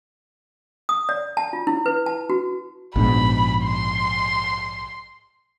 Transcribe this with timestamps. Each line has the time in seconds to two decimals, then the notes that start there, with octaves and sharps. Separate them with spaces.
0.89 D#6
1.09 D5
1.37 A5
1.53 F4
1.67 E4
1.86 B4
2.06 A5
2.30 F#4
2.96 A#1 G#2 B2 B5
3.64 C6